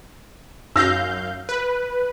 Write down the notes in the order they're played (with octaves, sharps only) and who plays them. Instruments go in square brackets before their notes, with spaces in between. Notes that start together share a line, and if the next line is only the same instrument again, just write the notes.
[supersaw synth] F#2 F5 G6 [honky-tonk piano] E6 A#6
[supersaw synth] B4